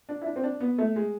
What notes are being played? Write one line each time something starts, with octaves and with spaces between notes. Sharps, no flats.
D4
E4
D4
C4
D4
B3
A3
G#3